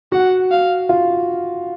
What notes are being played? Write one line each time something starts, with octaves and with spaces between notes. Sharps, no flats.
F#4 F#5
F5
F4